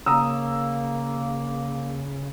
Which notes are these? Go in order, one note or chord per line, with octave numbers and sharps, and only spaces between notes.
C#3 A#3 A#5 D#6 E6